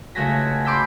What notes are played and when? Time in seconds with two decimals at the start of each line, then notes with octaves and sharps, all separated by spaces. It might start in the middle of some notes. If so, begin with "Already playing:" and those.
0.15 C#2 A3 F#4 G#5 A#6 B6
0.65 B5 C6 D6 E6 G6 B6